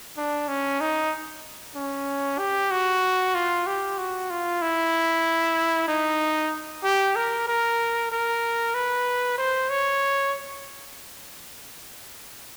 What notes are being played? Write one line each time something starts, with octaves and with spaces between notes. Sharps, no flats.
D4
C#4
D#4
C#4
G4
F#4
F4
G4
F#4
F4
E4
D#4
G4
A#4
A#4
A#4
B4
C5
C#5